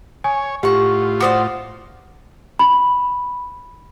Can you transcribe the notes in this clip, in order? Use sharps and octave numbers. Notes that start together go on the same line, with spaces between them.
C#5 G#5
A2 F4 G4 F#5 C#6
F#4 C5 D5 D6 D#6
B5